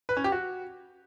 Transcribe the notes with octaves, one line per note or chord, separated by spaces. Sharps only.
B4
C#4
G4
F#4